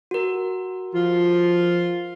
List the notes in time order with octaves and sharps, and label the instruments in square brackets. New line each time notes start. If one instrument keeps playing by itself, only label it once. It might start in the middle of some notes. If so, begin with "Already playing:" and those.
[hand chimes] F#4 A#4
[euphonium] F3 [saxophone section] F4